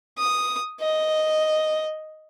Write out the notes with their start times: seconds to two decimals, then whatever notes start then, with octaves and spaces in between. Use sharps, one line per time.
0.18 D#6
0.80 D#5